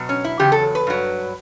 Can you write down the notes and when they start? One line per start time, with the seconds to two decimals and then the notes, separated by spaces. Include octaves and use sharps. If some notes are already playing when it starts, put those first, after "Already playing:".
Already playing: B2 F#3
0.09 C#4
0.25 E4
0.40 E2 C#3 F#3 G4
0.52 A4
0.75 B4
0.87 G2 F#3